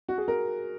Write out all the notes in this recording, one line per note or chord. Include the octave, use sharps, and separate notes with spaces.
F#4
G#4
A#4